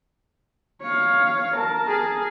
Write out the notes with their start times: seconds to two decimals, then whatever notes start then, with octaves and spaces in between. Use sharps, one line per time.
0.82 C#5 F5
1.57 A#4 A5
1.87 G#4